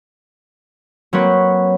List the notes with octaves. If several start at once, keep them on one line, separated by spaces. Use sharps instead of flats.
F#3 A#3 C4 B4 C#5